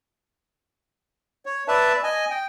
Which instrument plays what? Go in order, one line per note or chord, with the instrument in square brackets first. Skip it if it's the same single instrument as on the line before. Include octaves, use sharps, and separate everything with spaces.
[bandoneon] C#5
B4 D5 E5 A5
D#5 G#5
G5